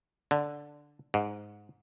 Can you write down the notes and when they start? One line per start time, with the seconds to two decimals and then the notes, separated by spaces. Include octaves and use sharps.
0.31 D3
1.14 G#2